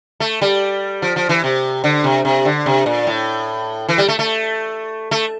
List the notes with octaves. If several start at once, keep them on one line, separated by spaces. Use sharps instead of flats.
A3
G3
F3
F3
E3
C3
D3
C3
C3
D3
C3
A#2
A2
E3
G3
A3
A3
A3